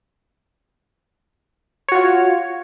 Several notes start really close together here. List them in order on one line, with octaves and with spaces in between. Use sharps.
C#5 F#4 F4